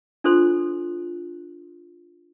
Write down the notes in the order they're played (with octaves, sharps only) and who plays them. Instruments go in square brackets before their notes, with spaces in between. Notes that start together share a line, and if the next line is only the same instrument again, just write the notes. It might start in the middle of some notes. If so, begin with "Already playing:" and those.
[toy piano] D4 F4 A4 C5 C6